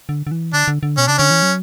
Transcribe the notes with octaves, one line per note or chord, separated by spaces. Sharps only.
D3
D3
E3
D3 D4
D3
D3
B2 C#4
C#3 D4
D3 C#4
E3
F#3